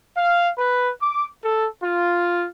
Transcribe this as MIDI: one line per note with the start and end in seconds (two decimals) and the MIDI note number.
0.17 0.49 77
0.58 0.91 71
1.01 1.26 86
1.43 1.67 69
1.82 2.46 65